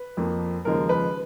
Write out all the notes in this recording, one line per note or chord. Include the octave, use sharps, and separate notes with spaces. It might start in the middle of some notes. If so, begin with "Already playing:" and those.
Already playing: B4
F2 F3 A#3
D#2 C#3 F3 G#3 A#4
B4